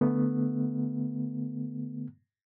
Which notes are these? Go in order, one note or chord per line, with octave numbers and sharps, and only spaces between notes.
D3 A3 B3